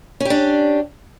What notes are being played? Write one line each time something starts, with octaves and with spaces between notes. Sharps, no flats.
C#4 D4 G4